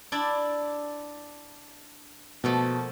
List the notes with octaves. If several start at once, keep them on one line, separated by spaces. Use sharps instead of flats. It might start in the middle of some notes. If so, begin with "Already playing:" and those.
D4 E4 D5
B2 F3 A3 A#3